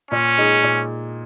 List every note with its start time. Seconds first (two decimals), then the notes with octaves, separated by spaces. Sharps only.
0.11 A#2 C#4
0.38 G#3 D#4 G#4
0.63 A#2